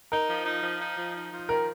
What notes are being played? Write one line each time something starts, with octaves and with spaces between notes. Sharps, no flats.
D#4 A#4
F3
D#4
F3
D#4
F3
D#4
F3
D#3 A#4